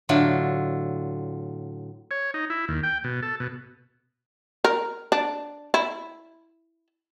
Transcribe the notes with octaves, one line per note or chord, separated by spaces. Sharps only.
A2 D3 F#3 F4
C#5
D#4
E4
D#2
G5
B2
A4
B2
A#4
D4
E4